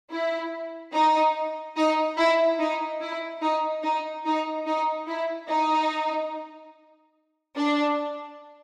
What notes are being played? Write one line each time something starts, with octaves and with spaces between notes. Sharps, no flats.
E4
D#4
D#4
E4
D#4
E4
D#4
D#4
D#4
D#4
E4
D#4
D4